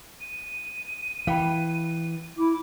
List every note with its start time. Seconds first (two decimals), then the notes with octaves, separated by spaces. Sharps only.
0.20 D#7
1.27 E3 F5 G5 B5
2.38 E4 D6